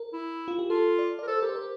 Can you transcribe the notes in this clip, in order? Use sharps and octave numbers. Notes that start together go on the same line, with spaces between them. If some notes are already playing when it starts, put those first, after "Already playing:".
Already playing: A#4
E4
F4
G4
F4 A4
D5
D5
A#4
A4 C5
G4 A#4
C5
A#4